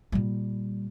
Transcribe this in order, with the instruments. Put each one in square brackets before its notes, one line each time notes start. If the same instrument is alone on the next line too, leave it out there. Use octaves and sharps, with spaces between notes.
[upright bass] A#2 G3